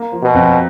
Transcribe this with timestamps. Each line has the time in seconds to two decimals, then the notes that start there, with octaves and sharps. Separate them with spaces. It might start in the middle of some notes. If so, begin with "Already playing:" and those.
Already playing: A#3
0.12 F3
0.22 B2
0.34 F2